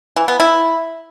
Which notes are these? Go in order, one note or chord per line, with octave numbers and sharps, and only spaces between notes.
E3
B3
E4